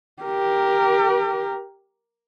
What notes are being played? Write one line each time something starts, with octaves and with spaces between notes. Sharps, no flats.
G4 A#4